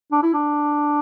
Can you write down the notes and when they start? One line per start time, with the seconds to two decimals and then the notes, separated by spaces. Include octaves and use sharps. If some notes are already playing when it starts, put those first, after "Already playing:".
0.12 D4
0.23 E4
0.33 D4